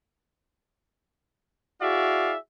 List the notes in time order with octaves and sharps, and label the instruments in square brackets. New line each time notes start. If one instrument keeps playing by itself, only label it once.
[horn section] E4 F#4 G#4 D5 E5 F5